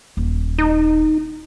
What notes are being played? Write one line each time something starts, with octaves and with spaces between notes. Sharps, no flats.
D#1
D#4